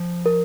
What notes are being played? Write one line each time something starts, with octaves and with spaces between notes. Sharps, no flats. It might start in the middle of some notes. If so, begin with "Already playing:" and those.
Already playing: F3
A#4